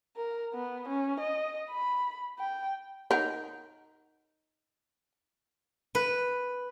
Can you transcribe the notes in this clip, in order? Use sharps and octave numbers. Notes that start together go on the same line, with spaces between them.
A#4
B3
C#4
D#5
B5
G5
D#4 A#4 C#5 F#5
B4